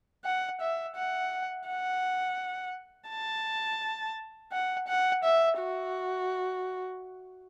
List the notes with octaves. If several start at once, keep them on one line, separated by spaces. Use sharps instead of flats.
F#5
E5
F#5
F#5
A5
F#5
F#5
E5
F#4